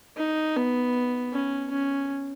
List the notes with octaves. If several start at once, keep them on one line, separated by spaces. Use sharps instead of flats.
D#4
B3
C#4
C#4